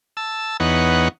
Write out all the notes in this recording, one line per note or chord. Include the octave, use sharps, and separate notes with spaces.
A5 E6
E2 B3 D#4 C#5 F#5